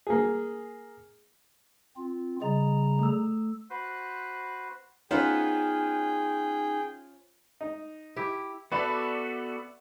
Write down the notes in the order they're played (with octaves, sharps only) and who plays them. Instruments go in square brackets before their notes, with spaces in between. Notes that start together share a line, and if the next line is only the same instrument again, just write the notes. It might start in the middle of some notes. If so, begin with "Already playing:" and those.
[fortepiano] A#3 G#4
[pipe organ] C4 F4
[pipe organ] C#3 G3 A#5 [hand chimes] D#5
[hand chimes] A3 E6
[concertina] F#4 B4 C5
[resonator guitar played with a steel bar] B3 [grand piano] C#4 F4 C5 [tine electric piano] D#4 [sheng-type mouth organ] G#4 G5
[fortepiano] D#4
[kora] E4 G4
[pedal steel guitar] B3 F#4 A4 [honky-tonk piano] B4 D5 E5